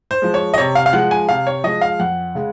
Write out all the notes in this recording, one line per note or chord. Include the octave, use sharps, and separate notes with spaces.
C5
F3 G#3
C#5
D#5
C3 C#5
F5
F5
F3 G#3 F#5
G#5
C3 F5
C#5
F3 G#3 D#5
F5
F2 F#5
C#3 G#3